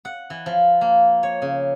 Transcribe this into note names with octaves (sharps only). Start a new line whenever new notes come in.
F#5
E3
F3
A#3
C#5
C#3